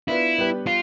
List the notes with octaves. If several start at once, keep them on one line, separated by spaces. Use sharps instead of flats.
B3 D4 E4 F4 B4
G3 B3 D4 G4 B4
F4